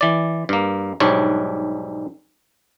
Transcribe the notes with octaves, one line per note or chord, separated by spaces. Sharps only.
E3 D5
G2 A#3
B1 G#2 G3 D4 C#5